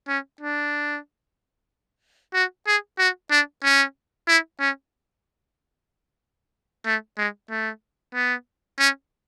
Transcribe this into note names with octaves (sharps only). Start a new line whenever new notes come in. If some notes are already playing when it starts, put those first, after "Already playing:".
C#4
D4
F#4
G#4
F#4
D4
C#4
E4
C#4
A3
G#3
A3
B3
C#4